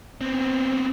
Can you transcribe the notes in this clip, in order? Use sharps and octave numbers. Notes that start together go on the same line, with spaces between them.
B3 C4